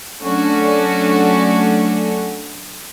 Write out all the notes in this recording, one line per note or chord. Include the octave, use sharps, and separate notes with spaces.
F#3 A3 C#4 D4 F#4